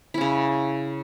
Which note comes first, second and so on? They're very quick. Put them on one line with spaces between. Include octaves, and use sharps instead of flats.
E4 C#4 C#3